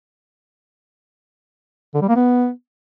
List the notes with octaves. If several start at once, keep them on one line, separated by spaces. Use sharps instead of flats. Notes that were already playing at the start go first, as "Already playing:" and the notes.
D3
G3
A#3
B3